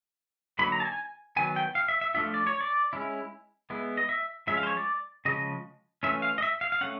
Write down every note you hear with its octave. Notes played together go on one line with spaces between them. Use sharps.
D3 F#3 A#3 D#4 B5
A#5
A5
G#5
D#3 F#3 B3 G#5
G5
F5
E5
E5
F3 A3 D4 F4 E5
D5
C#5
D5
G#3 C#4 E4
G#3 B3 E4
D#5
E5
F3 G#3 C#4 E5
F5
C5
C#5
D5
C#3 F3 G#3 D#5
E3 A3 C#4 F4 E5
F5
D#5
E5
F5
F5
A3 C#4 F#5